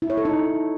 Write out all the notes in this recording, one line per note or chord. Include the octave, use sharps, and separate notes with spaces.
E4
C#5
A4
D#4